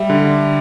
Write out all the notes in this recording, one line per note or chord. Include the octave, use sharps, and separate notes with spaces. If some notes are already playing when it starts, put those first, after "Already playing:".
Already playing: G3 E5
D3